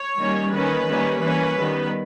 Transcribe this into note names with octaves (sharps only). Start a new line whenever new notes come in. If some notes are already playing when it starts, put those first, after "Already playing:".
Already playing: C#5
D#3 G3 A#3 C#4
D#3 A#3 C#4 B4
D#3 G3 A#3 C#4
E3 A#3 C#4 B4
D#3 G3 B3